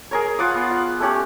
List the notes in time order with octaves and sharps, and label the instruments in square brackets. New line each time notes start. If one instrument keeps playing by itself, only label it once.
[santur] G#4 A#4 C#5
F4 F#5 D6 D#6
B3
F#5
A3 C#4 G4